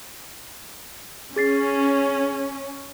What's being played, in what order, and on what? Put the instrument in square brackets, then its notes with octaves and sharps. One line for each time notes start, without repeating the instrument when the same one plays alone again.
[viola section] C#4 [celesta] G#4 A6 C7